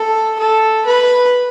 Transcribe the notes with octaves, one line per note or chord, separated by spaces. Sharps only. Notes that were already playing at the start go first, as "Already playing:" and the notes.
Already playing: A4
A4
B4